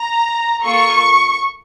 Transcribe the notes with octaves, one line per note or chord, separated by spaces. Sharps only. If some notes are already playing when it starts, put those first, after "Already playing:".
Already playing: A#5
A#3 F4 A4 C#6